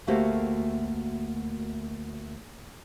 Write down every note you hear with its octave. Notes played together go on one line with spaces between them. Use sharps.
D2 A3 A#3 F#4 G4 C5